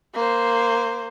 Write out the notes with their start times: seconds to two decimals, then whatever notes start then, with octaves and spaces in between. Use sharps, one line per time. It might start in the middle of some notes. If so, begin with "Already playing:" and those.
0.15 A#3 C5